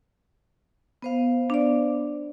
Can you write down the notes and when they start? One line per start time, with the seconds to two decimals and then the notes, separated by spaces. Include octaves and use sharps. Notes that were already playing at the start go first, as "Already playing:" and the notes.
1.02 B3 C5 F5
1.50 D4 D5